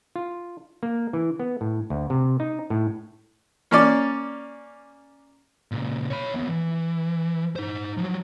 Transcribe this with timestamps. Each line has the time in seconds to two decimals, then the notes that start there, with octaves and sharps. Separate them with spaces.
0.16 F4
0.83 A#3
1.13 E3
1.40 B3
1.61 A2
1.90 D2
2.10 C3
2.40 D#4
2.70 A2
3.71 A#3 C#4 D5
5.72 A#2 C#3
6.10 C#5 B5
6.34 D#2 B3
6.49 E3
7.56 D#4 C5
7.97 F3 F#3